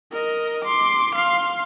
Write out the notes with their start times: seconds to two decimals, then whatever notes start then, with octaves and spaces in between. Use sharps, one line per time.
0.12 A#4 D#5
0.64 C6 D6
1.15 F5 C6